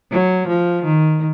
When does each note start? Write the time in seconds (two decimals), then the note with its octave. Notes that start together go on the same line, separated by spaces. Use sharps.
0.12 F#3
0.48 F3
0.85 D#3